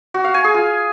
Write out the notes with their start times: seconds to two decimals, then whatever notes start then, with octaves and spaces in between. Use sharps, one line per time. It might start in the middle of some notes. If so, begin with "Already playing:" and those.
0.14 F#4
0.24 F5
0.34 G#5
0.44 G#4
0.54 F4